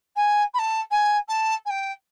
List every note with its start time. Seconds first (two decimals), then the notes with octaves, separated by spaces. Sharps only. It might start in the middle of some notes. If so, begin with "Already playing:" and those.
0.16 G#5
0.54 B5
0.58 A5
0.91 G#5
1.28 A5
1.65 G#5
1.70 G5